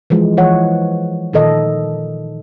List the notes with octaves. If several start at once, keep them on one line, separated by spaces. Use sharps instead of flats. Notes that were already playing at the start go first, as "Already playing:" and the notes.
E3 F3 G#3
E3 F3 C#5 F#5
A#2 D#3 A4 D#5